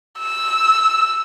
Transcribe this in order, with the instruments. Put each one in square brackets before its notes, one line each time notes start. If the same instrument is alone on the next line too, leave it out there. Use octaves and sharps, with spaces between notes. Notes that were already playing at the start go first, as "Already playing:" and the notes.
[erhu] E6